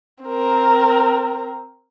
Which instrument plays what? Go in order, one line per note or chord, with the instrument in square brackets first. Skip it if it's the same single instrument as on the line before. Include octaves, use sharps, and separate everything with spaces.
[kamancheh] C4 A#4